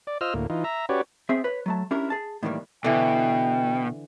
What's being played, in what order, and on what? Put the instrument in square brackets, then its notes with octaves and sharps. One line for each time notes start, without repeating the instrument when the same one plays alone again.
[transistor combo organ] D5
F4 C5 D#5 E6 F6
D2 A2 A#3
E3 D#4 F4
E5 A#5
C#4 F#4 G4 B4 C#5 D5
[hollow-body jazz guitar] B3 C4 G#4 E5
B4 C#5
F#3 A3 A5
C#4 D4 E4 G4 A#4
G#4 A5
A2 D#3 E3 G3 G#3 A#3
[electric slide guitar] B2 [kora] D3 E3 [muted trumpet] G5